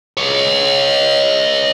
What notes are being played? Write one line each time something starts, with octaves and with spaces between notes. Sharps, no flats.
C#5 D#5